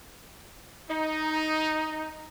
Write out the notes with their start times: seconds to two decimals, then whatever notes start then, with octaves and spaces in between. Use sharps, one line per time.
0.90 D#4